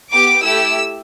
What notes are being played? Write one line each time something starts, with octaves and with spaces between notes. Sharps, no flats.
B3 G4 D6
A3 E4 G4 E6